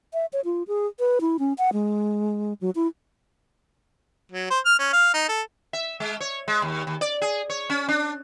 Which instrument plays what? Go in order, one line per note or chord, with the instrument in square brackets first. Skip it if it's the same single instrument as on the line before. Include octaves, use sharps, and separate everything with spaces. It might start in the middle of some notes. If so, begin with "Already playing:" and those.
[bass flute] E5
C#5
F4
G#4
B4
E4
C#4
F#5
G#3
F#3
E4
[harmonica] F#3
C5
F6
C#4
F5
D#4
A4
[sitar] E5
G#3
C#5
G#3
D#2
D#2
D5
G#4
C#5
C#4
D4